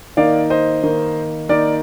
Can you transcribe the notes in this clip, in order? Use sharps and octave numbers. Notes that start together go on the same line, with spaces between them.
D#3 A#3 D#4 D5 F5
C5 D#5
D#3 A#3 D#4
D#3 A#3 D#4 A#4 D5